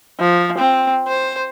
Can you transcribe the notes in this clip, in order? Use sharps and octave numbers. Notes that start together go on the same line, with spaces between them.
F3
C4
C5